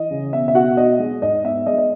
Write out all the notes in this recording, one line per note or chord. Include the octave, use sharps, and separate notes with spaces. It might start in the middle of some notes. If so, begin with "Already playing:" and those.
Already playing: E3 D#5
C#3
B2 E5
E5
B2 F#4 F#5
B3 D#5
G#3
G#2 D#5
B3 E5
G#3 D#5
D#5